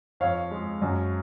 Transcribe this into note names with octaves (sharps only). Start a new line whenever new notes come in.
F2 C#5 F5
G#3
F#2